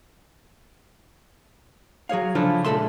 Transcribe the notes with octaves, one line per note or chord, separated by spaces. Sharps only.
F#3 G#4 C#5 F5
C#3 F3 D4 E4 F4 A4
A#2 G#3 G4 A4 E5 C6